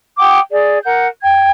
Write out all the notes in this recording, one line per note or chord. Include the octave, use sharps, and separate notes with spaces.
F#5 G5 D6 D#6
G#4 D5
A#4 F#5 G6
G5 G#6